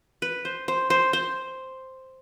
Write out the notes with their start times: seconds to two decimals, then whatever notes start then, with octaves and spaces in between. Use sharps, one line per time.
0.22 B4
0.45 C5
0.68 C5
0.90 C5
1.13 C5